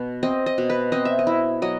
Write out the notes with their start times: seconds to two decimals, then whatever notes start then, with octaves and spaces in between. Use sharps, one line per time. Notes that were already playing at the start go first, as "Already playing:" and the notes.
Already playing: B2
0.23 C4 D#5
0.46 D#5
0.58 B2
0.70 B4
0.92 C4 D#5
1.05 E5
1.19 D#5
1.27 E4
1.62 F#3 D#5